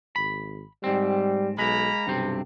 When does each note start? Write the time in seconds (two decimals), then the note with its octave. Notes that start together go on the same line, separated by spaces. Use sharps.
0.16 G#1 B5
0.84 G#2 G3 C4
1.58 B1 G#3 A#3 A#5 B5
2.07 B1 G2 C3 C4